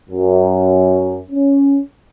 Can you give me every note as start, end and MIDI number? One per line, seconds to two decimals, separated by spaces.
0.10 1.18 42
1.31 1.79 61